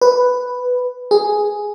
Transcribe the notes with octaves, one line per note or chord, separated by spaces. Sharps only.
B4
G#4